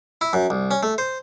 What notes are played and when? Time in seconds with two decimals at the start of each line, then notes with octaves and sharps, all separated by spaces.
0.21 E4
0.33 F#2
0.50 C2
0.71 C#4
0.83 A3
0.98 C5